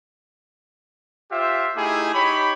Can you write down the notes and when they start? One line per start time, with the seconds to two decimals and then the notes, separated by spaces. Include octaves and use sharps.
1.32 F4 G4 C5 E5
1.76 A3 D#4 E4 G4 G#4
2.14 D#4 G4 C#5 B5